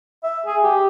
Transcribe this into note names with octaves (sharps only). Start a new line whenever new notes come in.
E5
G#4
G4